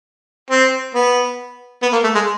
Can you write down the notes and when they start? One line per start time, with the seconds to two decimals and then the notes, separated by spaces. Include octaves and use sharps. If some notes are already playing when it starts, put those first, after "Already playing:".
0.51 C4
0.95 B3
1.82 B3
1.93 A#3
2.04 A3
2.15 G#3